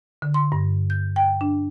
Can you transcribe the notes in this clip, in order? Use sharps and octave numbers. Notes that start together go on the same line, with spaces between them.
D3
C6
G2
G6
G5
D4